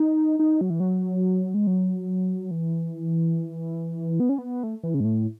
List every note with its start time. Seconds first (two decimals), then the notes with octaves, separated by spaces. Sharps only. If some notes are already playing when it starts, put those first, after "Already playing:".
Already playing: D#4
0.39 D#4
0.61 F#3
0.70 E3
0.80 F#3
1.54 G#3
1.67 F#3
2.51 E3
4.20 B3
4.29 C#4
4.38 B3
4.63 A3
4.83 E3
4.94 C#3
5.00 G#2
5.05 A2